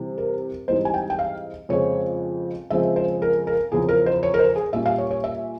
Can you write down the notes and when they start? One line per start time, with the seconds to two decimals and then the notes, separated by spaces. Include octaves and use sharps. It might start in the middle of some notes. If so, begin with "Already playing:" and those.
Already playing: C3 E3 G3
0.18 A#4
0.68 G#2 E3 G3 C4 C5
0.85 G#5
0.94 G5
1.10 G5
1.19 F5
1.69 F2 C#3 F3 G#3 C4 C#5
2.70 C#3 F3 G#3 C4 E5
2.96 C5
3.22 A#4
3.47 A#4
3.72 E2 C#3 F3 C4 G#4
3.89 A#4
4.06 C5
4.23 C#5
4.34 A#4
4.39 C5
4.56 G#4
4.73 A#2 G3 C#4 E5
4.86 F5
4.98 C#5
5.11 C#5
5.24 E5